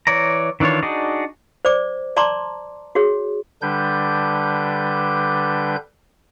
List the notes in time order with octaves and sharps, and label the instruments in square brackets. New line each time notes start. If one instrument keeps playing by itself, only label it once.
[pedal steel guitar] E3 C#5 D5 A#5
D#3 E3 D4 F4 C#5
D4 D#4 F#4 G#4 D5
[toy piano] C5 D5 D6
D5 A5 A#5 C6 D6
F#4 G#4 C#5
[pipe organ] D3 G3 D4 B4 G6